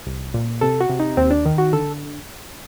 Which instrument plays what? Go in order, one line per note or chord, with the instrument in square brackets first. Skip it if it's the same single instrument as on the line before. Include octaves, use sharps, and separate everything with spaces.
[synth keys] C2
A#2
C3 A4
F#4
C3
D#4
D#2 C4
D4
D#3
F#4
D3 A4